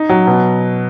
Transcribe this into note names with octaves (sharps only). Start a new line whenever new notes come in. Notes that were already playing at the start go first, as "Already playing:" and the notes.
Already playing: D#4
F#3
B2